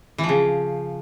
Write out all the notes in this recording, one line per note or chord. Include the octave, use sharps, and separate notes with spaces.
E3
F3
C#3